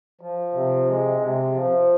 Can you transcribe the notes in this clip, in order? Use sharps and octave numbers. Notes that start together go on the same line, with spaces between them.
F3
C3
G#3
C3
F3